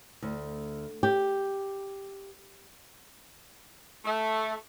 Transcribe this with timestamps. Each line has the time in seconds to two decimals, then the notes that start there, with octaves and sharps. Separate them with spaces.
0.22 D2
1.03 G4
4.05 A3